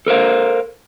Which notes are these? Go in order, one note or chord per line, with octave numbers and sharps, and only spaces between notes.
A4 A#4 C5 F5